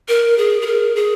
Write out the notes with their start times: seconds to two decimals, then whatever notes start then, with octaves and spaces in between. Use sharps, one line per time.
0.08 A#4
0.38 G#4
0.62 G#4
0.66 A#4
0.96 G#4